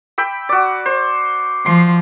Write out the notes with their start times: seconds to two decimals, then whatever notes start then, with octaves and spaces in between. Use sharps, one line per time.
0.18 G5 B5 E6
0.49 F#4 D5
0.86 C5
1.66 F3 C6